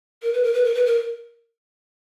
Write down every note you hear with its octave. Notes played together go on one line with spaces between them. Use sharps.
A#4
B4
A#4
B4
A#4
B4
A#4